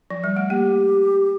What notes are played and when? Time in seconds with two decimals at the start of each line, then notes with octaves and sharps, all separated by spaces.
0.10 F3
0.24 G3
0.36 A3
0.50 A#3 G4